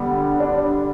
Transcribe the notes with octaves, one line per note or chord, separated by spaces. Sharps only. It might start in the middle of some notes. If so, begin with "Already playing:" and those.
Already playing: D3 G3 B3
D4